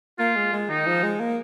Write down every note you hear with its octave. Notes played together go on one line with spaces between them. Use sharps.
A#3 F4
G#3
G#3
D#3 D#4
F3
G#3
A#3